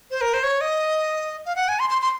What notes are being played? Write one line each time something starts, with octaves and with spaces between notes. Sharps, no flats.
C5
A#4
C5
C#5
D#5
F5
F#5
G#5
C6
C6
C6